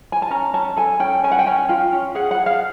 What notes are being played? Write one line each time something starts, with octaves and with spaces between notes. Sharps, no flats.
G#5
A5
C#4 A#5
C#4 A5
A4 G#5
C#4 G5
C#4 G#5
F#5
G5
C#4 G#5
F4 G5
C#4
G#4 F#5
F#5
G#4
F5